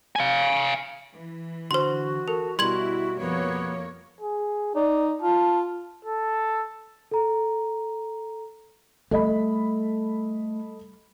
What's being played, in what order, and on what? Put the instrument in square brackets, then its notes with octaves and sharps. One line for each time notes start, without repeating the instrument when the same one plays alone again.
[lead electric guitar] F5 G#5
[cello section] E3
[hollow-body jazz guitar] D3 [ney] F#4 [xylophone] C5 C6
[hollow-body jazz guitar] A4 [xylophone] A#4
[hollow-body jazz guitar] B2 G3 [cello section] E4 [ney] F#4 [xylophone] C6 G#6 F#7
[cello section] F2 A#3 C#5 [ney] B3
[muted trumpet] G#4
[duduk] D#4 [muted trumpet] D5
[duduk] F4 [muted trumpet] A5
[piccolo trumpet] A4
[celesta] A4 A#5
[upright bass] G3 [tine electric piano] A3 [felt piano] A4 D#5 B5